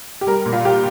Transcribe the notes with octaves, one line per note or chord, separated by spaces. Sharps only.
G4
G3 A#4
A#2
F4
G4